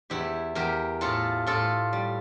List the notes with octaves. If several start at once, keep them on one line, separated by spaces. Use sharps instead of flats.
E2 E4 G4
E2 G4 A#4
A2 F4 A4
A2 F4 A4
G3